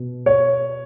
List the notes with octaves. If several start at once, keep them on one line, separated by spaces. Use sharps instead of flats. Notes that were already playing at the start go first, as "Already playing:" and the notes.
Already playing: B2
C#5